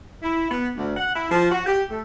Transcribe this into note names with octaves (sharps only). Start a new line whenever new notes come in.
E4
B3
D2
F#5
E4
F3
F#4
G4
A3